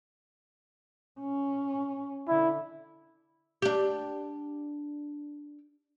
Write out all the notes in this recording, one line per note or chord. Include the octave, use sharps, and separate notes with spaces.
C#4
D3 E4
D4 G4